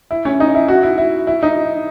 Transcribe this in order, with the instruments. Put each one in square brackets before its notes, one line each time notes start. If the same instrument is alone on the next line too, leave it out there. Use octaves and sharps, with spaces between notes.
[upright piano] E4
C#4
D#4
E4
F#4
E4
E4
E4
D#4